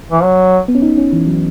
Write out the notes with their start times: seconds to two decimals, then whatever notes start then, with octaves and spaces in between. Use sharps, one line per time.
0.11 E3
0.23 F#3
0.68 B3
0.75 C#4
0.82 D#4
0.98 C#4
1.13 E3
1.27 F#3